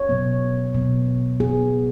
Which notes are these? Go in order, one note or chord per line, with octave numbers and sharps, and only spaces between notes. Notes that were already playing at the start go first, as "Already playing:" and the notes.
Already playing: C#5
B2 F#3 B3
B2 F#3 B3
B3 G#4